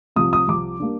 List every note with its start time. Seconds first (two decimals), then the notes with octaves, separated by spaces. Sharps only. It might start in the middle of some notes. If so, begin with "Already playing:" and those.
0.16 C2 C3 F3 D#6
0.33 D#6
0.48 C2 C3 F3 D6
0.80 G3 A#3 D4